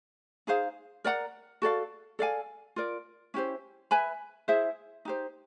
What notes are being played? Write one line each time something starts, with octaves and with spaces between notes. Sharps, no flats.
D#4 G#4 C5 F5
A#4 D5 F#5 A#5
F#4 A4 D5 F5
A4 D5 F5 G#5
F4 A#4 D5
C#4 E4 G4 C5
B4 E5 G#5 B5
E4 G#4 C5 E5
D#4 G4 C5